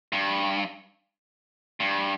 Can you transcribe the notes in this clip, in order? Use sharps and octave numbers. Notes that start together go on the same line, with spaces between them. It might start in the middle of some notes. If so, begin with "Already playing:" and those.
G2
G2